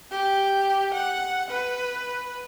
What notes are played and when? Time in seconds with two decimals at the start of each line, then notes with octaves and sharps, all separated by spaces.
0.11 G4
0.94 F#5
1.50 B4